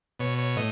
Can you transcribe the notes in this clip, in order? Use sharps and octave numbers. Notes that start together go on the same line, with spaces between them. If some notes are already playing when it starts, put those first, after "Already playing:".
B2 C#5
C#5
A2 D#5